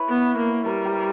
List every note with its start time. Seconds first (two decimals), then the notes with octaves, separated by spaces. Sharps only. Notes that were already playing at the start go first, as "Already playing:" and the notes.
Already playing: E4 B4 C#5
0.09 B3
0.38 A#3
0.66 G3 A#4
0.85 G4